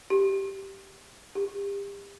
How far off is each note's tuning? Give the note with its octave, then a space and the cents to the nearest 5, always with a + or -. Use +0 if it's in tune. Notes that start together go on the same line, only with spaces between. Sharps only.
G4 -10
G4 +35